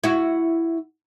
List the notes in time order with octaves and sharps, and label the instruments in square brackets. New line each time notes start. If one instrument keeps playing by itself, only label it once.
[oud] E4 F#4